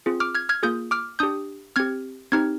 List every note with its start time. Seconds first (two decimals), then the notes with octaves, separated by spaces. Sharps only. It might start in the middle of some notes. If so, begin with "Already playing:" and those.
0.06 C4 F4 G#4
0.20 D6 F6
0.35 F6 G#6
0.49 F6 G#6
0.63 A#3 F4 G#4 D#6 G6
0.91 D6 F6
1.19 D4 G4 D#6 G6
1.76 C4 G4 F6 G#6
2.32 C4 D#4 G4 F6 G#6